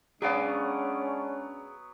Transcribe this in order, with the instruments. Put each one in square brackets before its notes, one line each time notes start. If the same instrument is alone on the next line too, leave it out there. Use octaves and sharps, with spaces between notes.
[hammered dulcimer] F#3 B3 [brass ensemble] G#3 C#4 D4 [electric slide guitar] G#4 D5 F5